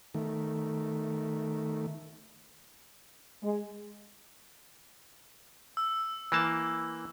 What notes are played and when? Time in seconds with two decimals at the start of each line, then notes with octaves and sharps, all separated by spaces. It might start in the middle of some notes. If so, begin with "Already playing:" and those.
0.14 D#3 A3
3.42 G#3
5.77 E6
6.32 E3 A#3 A5